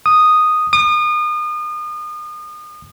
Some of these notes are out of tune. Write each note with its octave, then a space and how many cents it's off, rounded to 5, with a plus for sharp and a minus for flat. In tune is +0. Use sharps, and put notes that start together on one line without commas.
D#6 -5
D#6 -35